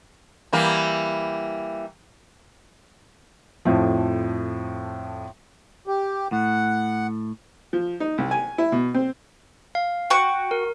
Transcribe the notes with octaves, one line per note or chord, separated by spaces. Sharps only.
E3 G3 A#3
F2 A2 F3
G4
A2 F#5
F3
D#4
C2
G#5
E4
B2
C4
F5
F#4 F#5 G5 C#6
A#4